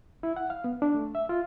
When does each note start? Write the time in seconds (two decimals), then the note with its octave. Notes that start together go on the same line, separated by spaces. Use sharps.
0.23 E4
0.36 F#5
0.50 F5
0.64 B3
0.82 D4
0.94 A3
1.15 E5
1.29 F4